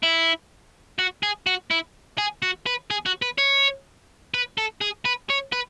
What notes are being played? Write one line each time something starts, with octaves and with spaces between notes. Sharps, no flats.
E4
F#4
G#4
F#4
E4
G#4
F#4
B4
G#4
F#4
B4
C#5
B4
A4
G#4
B4
C#5
B4